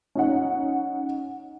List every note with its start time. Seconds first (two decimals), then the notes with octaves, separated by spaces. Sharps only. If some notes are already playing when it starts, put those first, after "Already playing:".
0.15 C#4 D#4 F#5